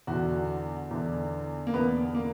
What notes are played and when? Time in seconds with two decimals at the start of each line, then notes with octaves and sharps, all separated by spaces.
0.07 E2 D3 F#4
0.91 E2 D3
1.67 A#3
1.74 E2 D3 B3
2.15 A#3